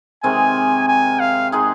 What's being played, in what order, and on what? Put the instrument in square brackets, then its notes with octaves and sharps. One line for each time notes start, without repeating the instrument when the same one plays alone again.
[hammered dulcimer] C3 D#3 G#3 C4 [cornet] G#5
[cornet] G#5
F5
[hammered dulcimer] G#3 D#4 G#4